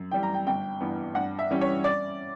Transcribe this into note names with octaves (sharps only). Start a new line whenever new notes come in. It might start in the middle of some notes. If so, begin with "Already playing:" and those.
Already playing: F#2
E3 G3 G5
A#5
G5
G1 G5
G2 E3 B3
G2 F#5
E5
E3 G3 C#4
C#5
D5